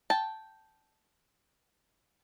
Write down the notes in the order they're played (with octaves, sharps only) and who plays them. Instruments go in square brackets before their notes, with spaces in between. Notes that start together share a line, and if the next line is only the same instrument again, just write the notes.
[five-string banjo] G5 A5